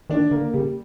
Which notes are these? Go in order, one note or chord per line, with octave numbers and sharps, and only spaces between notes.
D#3 D4
D3 A#3
C#3 G3